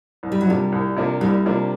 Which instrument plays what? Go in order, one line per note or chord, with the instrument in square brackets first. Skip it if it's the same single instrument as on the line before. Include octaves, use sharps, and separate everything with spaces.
[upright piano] C2
[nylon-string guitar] G3
F#3
[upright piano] C3 F3 A#3 D4 [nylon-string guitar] G3
[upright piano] C2
C3 F3 A#3 D4
[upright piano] C2 [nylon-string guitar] G3
[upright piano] C3 F3 A#3 D4